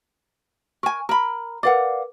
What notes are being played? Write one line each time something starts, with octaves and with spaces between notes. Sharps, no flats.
A#4 G#5 C#6
A#4 A#5 B5
A#4 B4 D5 F5 F#5 D6